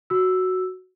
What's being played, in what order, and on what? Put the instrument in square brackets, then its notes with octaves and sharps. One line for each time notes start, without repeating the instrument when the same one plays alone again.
[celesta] F#4 E6